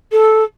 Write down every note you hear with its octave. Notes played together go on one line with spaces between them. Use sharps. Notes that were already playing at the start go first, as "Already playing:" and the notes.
A4